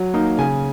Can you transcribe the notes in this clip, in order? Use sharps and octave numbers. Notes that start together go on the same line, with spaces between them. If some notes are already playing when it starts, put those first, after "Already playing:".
Already playing: F#3
A#3 D#4
C#3 G#5